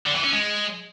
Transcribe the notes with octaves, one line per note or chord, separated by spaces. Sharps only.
D3
E3
C#4
G#3